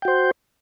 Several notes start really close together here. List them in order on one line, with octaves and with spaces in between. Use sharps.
G5 F#4 C5